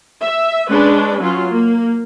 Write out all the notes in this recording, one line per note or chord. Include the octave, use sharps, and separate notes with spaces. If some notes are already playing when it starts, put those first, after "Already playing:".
E5
G#3 C#4 D4 B4
F#3 C#4 F4
A#3